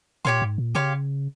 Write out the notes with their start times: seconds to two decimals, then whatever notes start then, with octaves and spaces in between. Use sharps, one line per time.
0.25 A#2 G4 C#5 F5 C6
0.42 G#2
0.58 A#2
0.75 C#3 G4 C#5 F5 C6